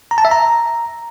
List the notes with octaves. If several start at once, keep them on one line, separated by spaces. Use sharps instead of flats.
A#5
A5
E5
A#5